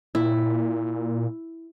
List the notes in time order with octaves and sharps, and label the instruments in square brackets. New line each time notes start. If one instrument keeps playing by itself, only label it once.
[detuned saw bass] A#2 [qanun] E4